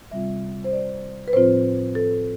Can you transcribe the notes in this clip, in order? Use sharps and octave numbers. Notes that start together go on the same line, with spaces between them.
C3 G3 C4 F4 E5
C5
D5
B4
A2 F3 C4 F4 C5
A4